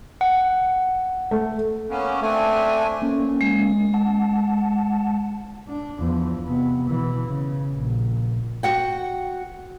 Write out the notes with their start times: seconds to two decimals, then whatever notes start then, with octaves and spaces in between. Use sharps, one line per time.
0.21 F#5
1.31 A3
1.90 A#3 B3 C#4
2.22 A3 C4 D4 G#5
3.02 A#3 C#4
3.41 G#3
3.94 F#5 A5
5.69 D4
6.00 E2 F3
6.46 C3 B3
6.89 B2 E3
7.28 C#3
7.76 A#1
8.63 F#4 F#5 G5